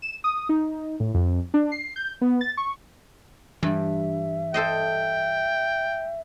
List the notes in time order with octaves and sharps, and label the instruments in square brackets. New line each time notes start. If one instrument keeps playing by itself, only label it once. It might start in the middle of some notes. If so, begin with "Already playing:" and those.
[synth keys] E7
D#6
D#4
A2
F2
D4
C7
G6
B3
A6
C#6
[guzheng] G2 [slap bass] E3 G3 [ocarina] E5
[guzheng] A4 C5 D#5 [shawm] G5